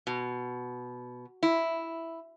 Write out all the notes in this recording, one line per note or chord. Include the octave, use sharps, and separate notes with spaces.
B2
E4